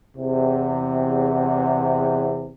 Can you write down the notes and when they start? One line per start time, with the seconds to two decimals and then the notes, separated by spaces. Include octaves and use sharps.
0.17 E2 C3